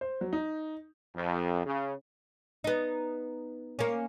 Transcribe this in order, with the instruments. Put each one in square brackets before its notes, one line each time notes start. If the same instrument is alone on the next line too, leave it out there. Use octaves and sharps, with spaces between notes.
[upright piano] C5
F#3
D#4
[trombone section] F2
C#3
[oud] B3 D#4
A#3 C#4